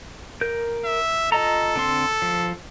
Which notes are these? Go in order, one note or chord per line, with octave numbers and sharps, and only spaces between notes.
A#4 G6
E5
F4 A4 D#5 A#5
D3 C4 C6
F3